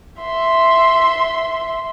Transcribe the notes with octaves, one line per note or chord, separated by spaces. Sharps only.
E5 C6